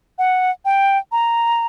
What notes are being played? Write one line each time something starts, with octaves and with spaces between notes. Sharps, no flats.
F#5
G5
A#5